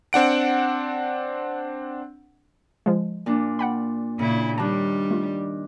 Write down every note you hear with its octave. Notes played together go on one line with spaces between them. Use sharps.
C4 D4 F#5 D7
F3 G#3
A#2 D4
F#5 G5 B5
A#2 C#3 E4
D#3 G3 D4 A5
A3 F4